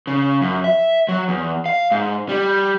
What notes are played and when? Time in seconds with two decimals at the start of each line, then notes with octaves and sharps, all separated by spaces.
0.07 C#3
0.42 F#2
0.64 E5
1.08 F#3
1.28 E2
1.66 F5
1.91 G#2
2.29 G3